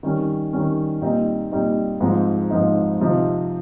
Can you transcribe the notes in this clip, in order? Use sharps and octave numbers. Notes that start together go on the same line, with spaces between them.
D#3 G3 C#4
D#3 G3 C#4
A#2 G3 C4 D#4
A#2 G3 C4 D#4
G#2 F3 C4 D#4
G#2 F3 C4 D#4
C3 F3 C4 D#4